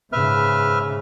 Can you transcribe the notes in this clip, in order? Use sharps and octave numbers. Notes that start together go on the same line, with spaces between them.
G#2 C#3 B4 E5 F6